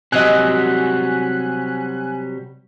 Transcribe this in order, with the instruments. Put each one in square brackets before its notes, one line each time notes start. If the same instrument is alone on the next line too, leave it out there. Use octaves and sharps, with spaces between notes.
[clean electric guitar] C3 F#3 G3 [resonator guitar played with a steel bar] C4 F#4 D#5 [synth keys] G#5 F#6